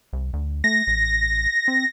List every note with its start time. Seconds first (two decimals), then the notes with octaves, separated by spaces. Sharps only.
0.13 C2
0.33 D2
0.64 A3 A#6
0.87 A1
1.68 C4